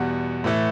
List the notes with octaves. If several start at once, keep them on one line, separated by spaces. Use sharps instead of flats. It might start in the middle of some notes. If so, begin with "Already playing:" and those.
Already playing: E2 B2 G3 F#5
A2 E3 A3